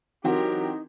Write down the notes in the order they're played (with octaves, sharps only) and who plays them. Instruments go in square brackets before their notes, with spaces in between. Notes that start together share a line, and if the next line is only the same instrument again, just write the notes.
[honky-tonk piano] E3 C4 F#4 [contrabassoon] F#3 [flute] D#4 [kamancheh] G4 A#4